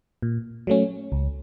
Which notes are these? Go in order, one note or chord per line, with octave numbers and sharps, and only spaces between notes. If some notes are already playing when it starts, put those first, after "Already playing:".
A#2
F#3 A3 C#4
C#2